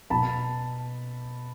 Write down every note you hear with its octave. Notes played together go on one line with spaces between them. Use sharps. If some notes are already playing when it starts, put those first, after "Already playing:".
B2 A5 B5